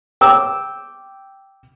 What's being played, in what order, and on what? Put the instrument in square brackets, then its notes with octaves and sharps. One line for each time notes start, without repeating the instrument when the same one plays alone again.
[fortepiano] G5 D6 E6